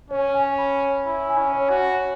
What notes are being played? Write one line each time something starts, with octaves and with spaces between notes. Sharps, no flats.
C#4 C#5
G#5
B5
C#5
E4 B5
G#5
C#4
C#5
F#4
G#5